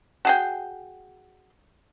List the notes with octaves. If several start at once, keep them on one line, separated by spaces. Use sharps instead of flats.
F#4 G#4 G5